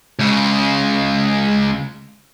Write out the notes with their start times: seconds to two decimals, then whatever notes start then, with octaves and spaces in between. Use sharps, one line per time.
0.19 C#2 C#3